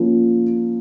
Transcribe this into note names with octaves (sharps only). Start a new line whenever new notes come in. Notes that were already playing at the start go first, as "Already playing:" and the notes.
Already playing: F3 A#3 C#4 F4